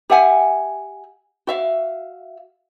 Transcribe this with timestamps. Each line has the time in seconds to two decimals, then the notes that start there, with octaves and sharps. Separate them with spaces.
0.10 G4 E5 F#5 G#5
1.47 F#4 E5 F5